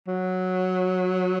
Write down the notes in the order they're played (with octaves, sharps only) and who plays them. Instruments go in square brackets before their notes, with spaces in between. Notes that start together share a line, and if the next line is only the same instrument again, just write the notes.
[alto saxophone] F#3